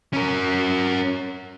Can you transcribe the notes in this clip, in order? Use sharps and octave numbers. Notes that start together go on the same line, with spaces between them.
C#4 A#4